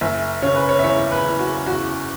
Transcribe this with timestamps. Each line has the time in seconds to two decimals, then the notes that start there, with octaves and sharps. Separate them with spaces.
0.01 F#1 E5
0.42 C#3 C#5
0.55 B4
0.69 C#5
0.79 E5
0.83 E2 C#5
1.11 B4
1.25 E2
1.39 F#4
1.66 E2 F#4